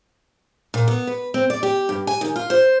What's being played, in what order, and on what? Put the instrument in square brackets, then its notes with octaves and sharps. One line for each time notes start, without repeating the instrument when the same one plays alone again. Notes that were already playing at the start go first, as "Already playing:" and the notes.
[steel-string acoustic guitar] A#2
B3
B4
C4
D5
G4
G2
G#5
D#3
F4
C5